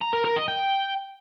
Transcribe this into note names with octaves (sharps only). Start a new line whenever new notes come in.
A#5
A#4
A#4
D#5
G5